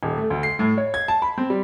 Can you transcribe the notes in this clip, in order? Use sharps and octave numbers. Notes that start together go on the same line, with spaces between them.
D#1
A3
D2
C7
A2
C#5
G#6
A5
B5
C4
G3